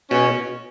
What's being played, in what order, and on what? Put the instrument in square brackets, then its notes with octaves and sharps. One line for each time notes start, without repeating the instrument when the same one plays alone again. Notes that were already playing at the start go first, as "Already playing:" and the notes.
[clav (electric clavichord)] B2 [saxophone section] C#4